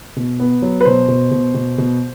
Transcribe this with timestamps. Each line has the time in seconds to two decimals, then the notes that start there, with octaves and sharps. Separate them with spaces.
0.16 B2
0.40 B3
0.62 F#3
0.81 B4
0.85 B2 C5
1.08 B2
1.31 B2
1.54 B2
1.78 B2